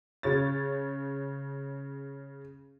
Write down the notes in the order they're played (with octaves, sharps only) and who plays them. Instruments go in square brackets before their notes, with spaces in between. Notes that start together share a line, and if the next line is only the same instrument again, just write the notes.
[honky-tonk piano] C#3 C#5 A6